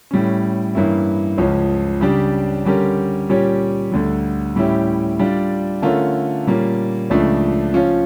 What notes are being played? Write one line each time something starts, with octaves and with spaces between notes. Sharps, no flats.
A2 G3 C#4
G2 E3 A#3 C#4 E4
C#2 C#3 F3 C#4
C#3 G3 D4 G4
D3 G3 C#4 G4 A#4
A#2 G3 C#4 G4 C#5
D2 D3 G3
A2 G3 C#4 E4 G4
G3 D4 F4
D3 A3 C#4 F4 A#4
A#2 G3 A#3 C#4
C#2 C#3 F3 A3 D4
F3 C#4 F4